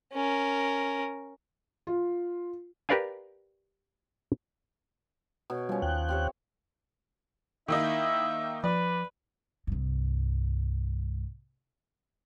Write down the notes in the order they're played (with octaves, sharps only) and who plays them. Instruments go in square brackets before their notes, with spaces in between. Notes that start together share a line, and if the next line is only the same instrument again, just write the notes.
[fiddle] C#4 A#4
[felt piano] F4
[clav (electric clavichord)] G4 A#4 B4 D5 F5 G#5
[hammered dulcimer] B2 C#5
[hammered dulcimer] F3 C#4 [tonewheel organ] G3
[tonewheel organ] D#2 G5 F#6
[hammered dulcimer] C4 G4 C#5
[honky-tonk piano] D#3 A#3 D#4 [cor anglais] E4 [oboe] E5
[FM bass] F3 [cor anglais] B4 [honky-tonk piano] D5
[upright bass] C2 G2